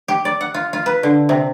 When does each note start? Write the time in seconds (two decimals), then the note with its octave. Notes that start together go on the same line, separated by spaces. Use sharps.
0.08 G4
0.25 D5
0.41 F#5
0.54 F4
0.73 F4
0.86 B4
1.03 D3
1.29 C3